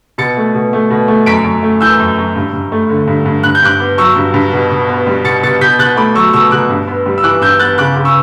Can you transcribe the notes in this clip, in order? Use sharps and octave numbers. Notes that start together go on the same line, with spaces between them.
B2 A6 C#7
A3
B2
A3
B2
A3
F#2 B6 D7
F#2
A3
E3 E6 G6
F#2
F#2
G2
G2
A3
D3
G2
G2
G2 F#6
G6
G2 D6 F#6
B3
F#3 C#6 E6
G2
G2
B2
B2
B3
G3
B2 A6 C#7
B2 A6 C#7
B2 G6 B6
B2 F#6 A6
A3 B5 D6
F#3 C#6 E6
B2 C#6 E6
B2 D6 F#6
G2
B3
G3
E6
E3 D6 F#6
G2 E6 G6
B3 F#6 A6
C#3 D6 F#6
C#3
C#6 E6